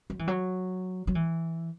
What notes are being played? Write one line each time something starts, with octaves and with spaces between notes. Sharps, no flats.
F#3
E3
F#3
F#3
E3